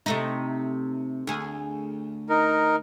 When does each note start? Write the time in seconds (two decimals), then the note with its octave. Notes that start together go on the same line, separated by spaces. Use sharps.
0.06 C3 A3 D#4
1.27 D2 G#4
2.29 D#4 A#4